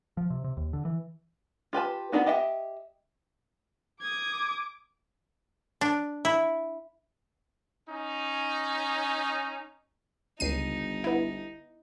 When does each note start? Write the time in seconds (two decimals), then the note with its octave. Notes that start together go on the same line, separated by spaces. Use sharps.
0.17 F3
0.30 C3
0.44 C3
0.57 D#2
0.73 D3
0.85 E3
1.73 F4 G4 B4 A5
2.12 B3 D4 D#4 F#4
2.26 G4 D#5 E5 F#5 G5
4.01 D6 D#6 G#6
5.81 D4
6.25 E4
7.89 C#4 D#4
10.40 G1 C#2 D#4 C7 D#7
11.04 B3 E4